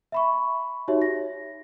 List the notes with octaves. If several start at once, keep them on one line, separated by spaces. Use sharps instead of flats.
E5 B5 C#6
D#4 F#4 G4 C#5 E5
A#6